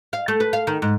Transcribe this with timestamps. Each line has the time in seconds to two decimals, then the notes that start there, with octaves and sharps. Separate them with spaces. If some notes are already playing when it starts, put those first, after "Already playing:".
0.13 F5
0.28 A3
0.40 B4
0.53 F5
0.67 D#3
0.82 G#2